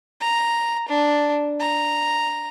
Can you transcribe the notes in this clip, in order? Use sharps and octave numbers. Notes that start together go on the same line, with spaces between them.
A#5
D4
A#5